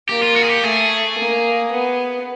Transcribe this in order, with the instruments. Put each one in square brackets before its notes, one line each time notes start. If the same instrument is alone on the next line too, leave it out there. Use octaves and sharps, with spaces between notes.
[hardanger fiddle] A#3 [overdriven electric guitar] G4
[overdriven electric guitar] F4
F#4
G#4
G4
[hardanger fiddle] A3 [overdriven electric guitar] G#4
[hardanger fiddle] A#3
B3